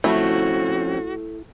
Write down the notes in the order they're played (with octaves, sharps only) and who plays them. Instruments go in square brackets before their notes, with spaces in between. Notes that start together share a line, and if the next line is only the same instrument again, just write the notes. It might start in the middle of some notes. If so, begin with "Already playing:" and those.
[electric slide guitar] F3 C4 C#4 [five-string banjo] A3 [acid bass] E4 [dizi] F#4